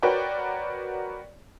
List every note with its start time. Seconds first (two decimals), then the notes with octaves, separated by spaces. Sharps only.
0.02 F#4 A#4 B4 C#5 D5 G5